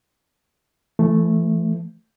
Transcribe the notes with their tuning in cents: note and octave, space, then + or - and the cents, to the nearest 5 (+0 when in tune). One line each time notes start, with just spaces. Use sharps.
E3 +40 A3 +0